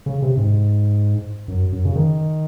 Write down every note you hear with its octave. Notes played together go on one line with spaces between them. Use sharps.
C#3
C3
G#2
F#2
F#2
C#3
D#3